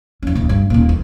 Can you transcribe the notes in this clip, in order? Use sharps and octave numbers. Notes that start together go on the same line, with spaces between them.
E2 C#4
D#1 C#2
G2
D#1 A#2
E2